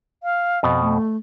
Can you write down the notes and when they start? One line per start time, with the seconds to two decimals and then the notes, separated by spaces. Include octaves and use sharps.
0.23 F5
0.63 F2 B2
0.80 A3